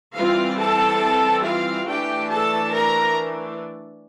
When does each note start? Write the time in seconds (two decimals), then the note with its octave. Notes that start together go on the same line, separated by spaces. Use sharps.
0.15 E3 G3 C4 F4 F5
0.58 A4 A5
1.43 F4 F5
1.86 E3 A3 D4 G4 G5
2.29 A4 A5
2.72 A#4 A#5